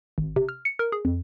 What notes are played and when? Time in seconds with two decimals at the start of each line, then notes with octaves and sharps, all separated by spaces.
0.18 G#1
0.36 C3
0.49 F6
0.65 C#7
0.79 A#4
0.92 G#4
1.05 F2